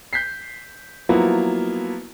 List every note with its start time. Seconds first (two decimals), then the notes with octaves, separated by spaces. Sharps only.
0.13 G6 B6 C7
1.09 F3 F#3 A#3 B3 E4 F4